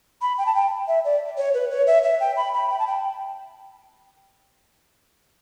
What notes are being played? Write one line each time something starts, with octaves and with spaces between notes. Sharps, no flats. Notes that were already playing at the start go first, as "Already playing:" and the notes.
B5
G5
A5
G5
E5
D5
C#5
B4
C#5
E5
E5
G5
B5
B5
G5
A5
G5